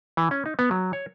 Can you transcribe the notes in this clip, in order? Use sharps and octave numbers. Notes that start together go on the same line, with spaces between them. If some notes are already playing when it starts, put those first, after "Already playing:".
E3
C#4
D#4
B3
F#3
C#5